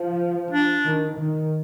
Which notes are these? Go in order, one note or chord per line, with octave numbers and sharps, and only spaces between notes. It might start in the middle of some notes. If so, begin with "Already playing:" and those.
Already playing: F3
D4
D#3
D#3